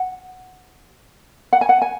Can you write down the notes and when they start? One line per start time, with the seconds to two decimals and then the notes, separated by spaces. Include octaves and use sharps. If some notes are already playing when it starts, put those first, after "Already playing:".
Already playing: F#5
1.53 F#5
1.61 G#5
1.69 F#5
1.82 G#5